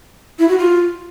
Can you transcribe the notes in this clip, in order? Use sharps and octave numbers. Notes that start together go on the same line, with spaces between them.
E4
F#4
F4